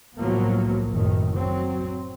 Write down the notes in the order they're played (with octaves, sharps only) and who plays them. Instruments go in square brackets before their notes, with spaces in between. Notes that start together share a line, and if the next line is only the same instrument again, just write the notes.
[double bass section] C2 A2 F3 F#3 A#3 B3
F#1 A2 D#3
F#3 C4